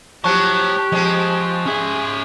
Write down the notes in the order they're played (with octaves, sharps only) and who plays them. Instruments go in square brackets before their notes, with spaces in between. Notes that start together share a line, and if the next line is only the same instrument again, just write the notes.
[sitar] F3 F#3 [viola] G4 [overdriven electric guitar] C#5 A5 [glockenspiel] C#6 F#6
[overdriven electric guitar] F3 [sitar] G#3 C4
[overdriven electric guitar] C#4 E5 [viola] G#4